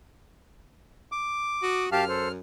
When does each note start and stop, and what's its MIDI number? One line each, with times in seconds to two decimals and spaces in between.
1.12 1.86 86
1.63 1.88 66
1.63 1.88 87
1.92 2.40 42
1.92 2.05 67
1.92 2.05 77
1.92 2.05 81
1.92 2.32 89
2.09 2.28 69
2.09 2.28 72